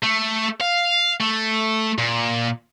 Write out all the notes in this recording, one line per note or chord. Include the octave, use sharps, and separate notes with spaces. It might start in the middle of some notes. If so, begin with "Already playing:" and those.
A3
F5
A3
A#2